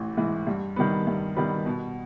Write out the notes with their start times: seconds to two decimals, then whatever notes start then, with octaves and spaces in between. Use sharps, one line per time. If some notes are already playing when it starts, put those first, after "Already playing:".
Already playing: A1 E3
0.17 G#2 E3
0.47 G2
0.76 D#3 G3 B3
1.07 G2
1.36 D#3 G3 B3
1.66 B2